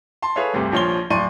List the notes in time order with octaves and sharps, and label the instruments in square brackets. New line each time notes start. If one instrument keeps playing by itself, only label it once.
[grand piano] A5 C6
G#4 A4 B4 C#5 E5 F5
G1 D2 C3
A#1 F3 C#5 C6 G7
D1 D5 C6 C#6 D#7